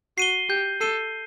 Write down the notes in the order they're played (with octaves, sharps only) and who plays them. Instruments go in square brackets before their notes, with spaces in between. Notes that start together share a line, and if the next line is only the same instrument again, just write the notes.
[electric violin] F#4 [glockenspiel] C7 D#7 G7
[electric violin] G4 [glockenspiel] G6
[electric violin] A4 [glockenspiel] C7 D#7 G7